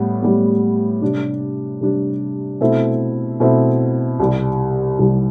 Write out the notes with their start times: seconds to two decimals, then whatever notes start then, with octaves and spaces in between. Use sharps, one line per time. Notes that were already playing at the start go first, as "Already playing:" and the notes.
Already playing: A2 G3 B3
0.22 A2 G3 B3
1.02 C3 G3 D4
1.81 C3 G3 D4
2.61 B2 A3 C4 E4
3.40 B2 A3 C4 E4
4.20 C2 C3 G3
4.99 C2 C3 G3